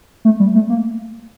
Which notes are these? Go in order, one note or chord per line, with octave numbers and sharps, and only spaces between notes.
A3
G3
A3
A#3